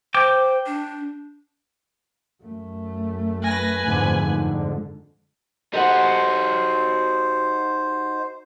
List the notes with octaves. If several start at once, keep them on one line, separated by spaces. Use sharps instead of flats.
C5 G5 D6
D4
F#2 A3
B4 G#5 A#6
F2 G#2 D3
D#4 F#4 G4 A4 C5 F#5